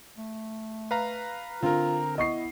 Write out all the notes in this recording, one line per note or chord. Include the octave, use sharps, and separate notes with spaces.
A3
B4 F5 A#5
D3 C4 F4 A#4 A#5
B3 E4 D#5 C#6 C7